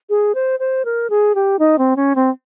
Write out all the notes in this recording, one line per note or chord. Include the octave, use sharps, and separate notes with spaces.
G#4
C5
C5
A#4
G#4
G4
D#4
C4
C#4
C4